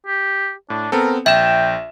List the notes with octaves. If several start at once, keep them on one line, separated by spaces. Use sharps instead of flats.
G4
A2 D4
B3 C4 A4 A#4
A#1 E5 G5 E7